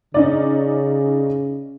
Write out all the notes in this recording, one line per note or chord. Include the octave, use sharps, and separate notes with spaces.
C#3 C#4 D#4 D5